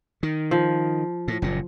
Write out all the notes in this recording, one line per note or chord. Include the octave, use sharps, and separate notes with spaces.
D#3
F3
A2
F#1 A#2